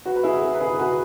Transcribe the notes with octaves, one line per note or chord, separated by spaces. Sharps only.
F#4 B4
B4
E4 G#4
B4
E4 G#4
F#4 B4